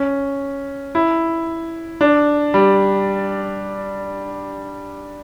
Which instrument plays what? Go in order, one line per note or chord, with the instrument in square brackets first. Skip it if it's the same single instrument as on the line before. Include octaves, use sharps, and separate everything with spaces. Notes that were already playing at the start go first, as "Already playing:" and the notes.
Already playing: [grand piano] C#4
E4
D4
G3